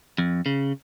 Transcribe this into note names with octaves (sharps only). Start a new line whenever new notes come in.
F2
C#3